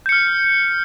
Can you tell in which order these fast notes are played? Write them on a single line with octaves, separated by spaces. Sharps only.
G6 C#7 F6